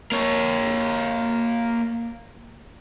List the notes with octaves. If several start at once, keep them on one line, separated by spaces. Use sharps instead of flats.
A#3 C#5